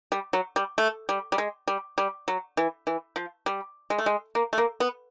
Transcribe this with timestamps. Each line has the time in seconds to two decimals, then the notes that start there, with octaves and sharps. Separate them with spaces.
0.12 G3
0.33 F#3
0.56 G3
0.78 A3
1.09 G3
1.32 G3
1.38 G#3
1.68 G3
1.98 G3
2.28 F#3
2.57 E3
2.87 E3
3.16 F3
3.46 G3
3.90 G#3
3.98 A3
4.06 G#3
4.35 A#3
4.53 A3
4.58 A#3
4.80 B3